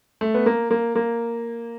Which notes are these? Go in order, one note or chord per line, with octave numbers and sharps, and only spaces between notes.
A3
B3
A#3
A#3
A#3